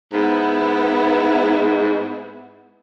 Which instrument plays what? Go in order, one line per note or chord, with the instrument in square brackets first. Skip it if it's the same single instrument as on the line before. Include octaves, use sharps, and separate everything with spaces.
[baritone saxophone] G#2 [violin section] B3 E4